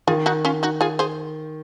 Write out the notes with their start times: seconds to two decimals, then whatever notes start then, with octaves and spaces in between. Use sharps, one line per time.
0.07 D#3 F4 G#4
0.26 D#4 F#4
0.45 C#4 F4
0.63 D#4 F#4
0.81 F4 G#4
0.99 G#4 C5